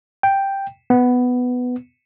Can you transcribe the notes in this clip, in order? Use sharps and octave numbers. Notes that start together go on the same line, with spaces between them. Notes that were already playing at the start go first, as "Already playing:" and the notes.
G5
B3